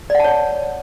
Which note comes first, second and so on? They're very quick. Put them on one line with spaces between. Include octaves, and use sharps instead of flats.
D5 F#5 A5 C#5